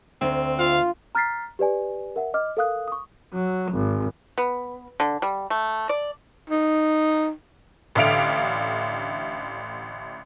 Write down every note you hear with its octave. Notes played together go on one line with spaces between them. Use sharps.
D2 C4
F4 F5
A#5 F6 F#6 A6 B6 C7
G4 B4 D5 G#5
A#4 E5 F#5
D#5 D6 F6
A4 A#4 F5 D#6 F#6
C#6 D#6
F#3
G#1
B3
D3
G3
A3
D5
D#4
A1 D3 E5 F5 D7 F7